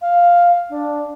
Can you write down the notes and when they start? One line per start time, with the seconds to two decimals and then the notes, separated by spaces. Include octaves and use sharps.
0.02 F5
0.70 D4